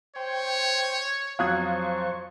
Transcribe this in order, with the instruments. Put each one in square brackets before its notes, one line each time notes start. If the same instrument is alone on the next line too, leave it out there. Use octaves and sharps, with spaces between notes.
[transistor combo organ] C5 G5 [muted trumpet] C#5
[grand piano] F2 F#3 D#6 [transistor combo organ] C5 C#6 [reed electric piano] F5 F#6 G#6